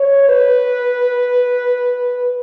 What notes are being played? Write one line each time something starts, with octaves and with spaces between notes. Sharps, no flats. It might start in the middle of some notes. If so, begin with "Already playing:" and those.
Already playing: C#5
B4